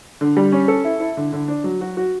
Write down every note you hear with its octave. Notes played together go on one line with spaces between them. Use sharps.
D3
G3
C#4
A4
E4
E4
D3
D3
D4
F#3
F#4
F#4